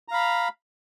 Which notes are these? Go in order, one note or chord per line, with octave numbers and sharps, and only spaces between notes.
F5 A#5 B5